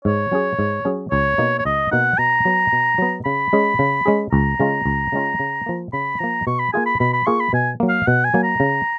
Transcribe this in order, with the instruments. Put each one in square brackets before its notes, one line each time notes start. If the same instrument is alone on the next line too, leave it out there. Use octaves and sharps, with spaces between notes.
[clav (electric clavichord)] G#2 [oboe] C#5
[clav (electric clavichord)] F#3 C#4 G#4
G#2
F#3 C#4 G#4
[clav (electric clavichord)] C#2 [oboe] C#5
[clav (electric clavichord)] B2 A#3 D#4
[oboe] C#5
[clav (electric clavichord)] C#2 [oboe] D#5
[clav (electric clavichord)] B2 A#3 D#4 [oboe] F#5
[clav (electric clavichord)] B2 [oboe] A#5
[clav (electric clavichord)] F#3 B3
B2
F#3 B3
[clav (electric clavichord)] C#3 [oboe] B5
[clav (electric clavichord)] G#3 C#4 G#4
C#3
G#3 C#4 G#4
[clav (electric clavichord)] C#2 [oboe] A#5
[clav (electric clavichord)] C#3 G#3 C#4 F4
C#2
C#3 G#3 C#4 F4
C#3
F3 A#3
[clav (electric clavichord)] C#3 [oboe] B5
[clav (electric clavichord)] F3 A#3 [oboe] A#5
[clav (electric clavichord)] B2 [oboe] C#6
[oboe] B5
[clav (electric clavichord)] A#3 F4 G#4 [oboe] G#5
[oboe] B5
[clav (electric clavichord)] B2 [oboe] B5
[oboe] B5
[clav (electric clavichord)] A#3 F4 G#4 [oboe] C#6
[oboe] B5
[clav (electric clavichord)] B2 [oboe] G#5
[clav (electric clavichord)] F#3 A#3
[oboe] F5
[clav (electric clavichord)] B2 [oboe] F#5
[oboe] G#5
[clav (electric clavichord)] F#3 A#3
[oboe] A#5
[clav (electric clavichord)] C#3